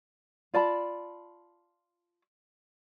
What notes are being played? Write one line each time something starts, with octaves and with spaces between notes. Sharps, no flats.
F4 D5 A5 B5